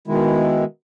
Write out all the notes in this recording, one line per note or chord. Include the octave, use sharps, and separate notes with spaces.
B2 D#3 G#3 E4